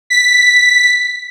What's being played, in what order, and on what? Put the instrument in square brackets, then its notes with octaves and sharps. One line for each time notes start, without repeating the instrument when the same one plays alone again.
[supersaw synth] B6